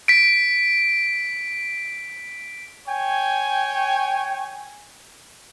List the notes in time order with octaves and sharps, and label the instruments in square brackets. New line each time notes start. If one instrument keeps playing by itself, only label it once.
[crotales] B6 D7
[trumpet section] C#5 G5 G#5